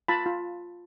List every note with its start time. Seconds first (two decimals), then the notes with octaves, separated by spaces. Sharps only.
0.08 F4 A5 B5
0.26 F4